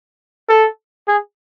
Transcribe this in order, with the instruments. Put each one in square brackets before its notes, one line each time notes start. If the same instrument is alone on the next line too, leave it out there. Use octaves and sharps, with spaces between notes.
[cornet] A4
G#4